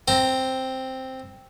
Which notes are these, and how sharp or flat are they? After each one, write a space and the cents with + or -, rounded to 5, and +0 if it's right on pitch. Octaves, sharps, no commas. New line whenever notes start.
C4 +0 A#5 +0